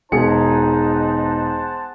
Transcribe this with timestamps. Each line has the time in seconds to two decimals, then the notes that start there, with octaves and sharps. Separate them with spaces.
0.12 E1 D#4 G#4 C5 F#5 A5 C#7